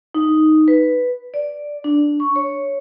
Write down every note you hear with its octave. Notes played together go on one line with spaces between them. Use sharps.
D#4
B4
D5
D4
C#6
C#5